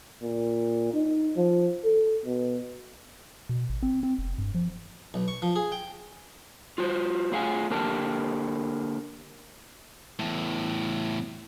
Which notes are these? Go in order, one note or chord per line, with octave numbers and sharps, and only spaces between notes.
A#2
D#4
F3
A4
B2
B2
G#1
C4
C4
F1
G2
F3
B1
C#6
F3
G#4
G5
F4 F#4 C5
A3 F4 G#4 F5 F#5 G#5
D3 A#3 G4 A#4 G5 A5
E2 A2